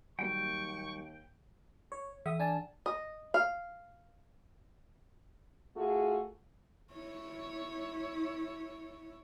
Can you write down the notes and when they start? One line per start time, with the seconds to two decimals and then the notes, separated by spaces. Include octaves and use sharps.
0.19 D#2 F#3 G3 A#3 G5 C#6
1.92 C#5
2.26 E3 E5 D#6
2.39 D4 G#5 A5
2.86 D#5
3.34 F5
5.77 A3 F4 F#4 G#4
6.93 E4 C#5